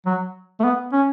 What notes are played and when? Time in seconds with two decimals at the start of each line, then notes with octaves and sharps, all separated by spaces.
0.06 F#3
0.60 A3
0.64 B3
0.93 C#4